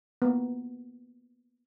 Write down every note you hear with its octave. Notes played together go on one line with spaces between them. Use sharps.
A#3 B3